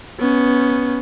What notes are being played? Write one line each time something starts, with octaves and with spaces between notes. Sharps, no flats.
B3 C#4